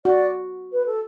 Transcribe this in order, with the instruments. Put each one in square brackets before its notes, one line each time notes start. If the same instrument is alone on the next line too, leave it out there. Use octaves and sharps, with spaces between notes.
[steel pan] F#4 [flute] D5
[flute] B4
A4